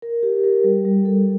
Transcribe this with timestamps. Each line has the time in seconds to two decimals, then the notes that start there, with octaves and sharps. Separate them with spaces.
0.02 A#4
0.23 G4
0.44 A#4
0.64 G3
0.85 G3
1.05 A4